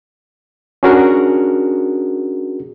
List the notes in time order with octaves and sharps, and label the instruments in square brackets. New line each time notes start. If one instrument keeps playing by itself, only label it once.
[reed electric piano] C#4 D4 F#4 G#4 A#4